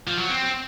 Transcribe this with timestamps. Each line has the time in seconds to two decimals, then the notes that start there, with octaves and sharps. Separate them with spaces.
0.07 F3
0.18 F#3
0.29 C4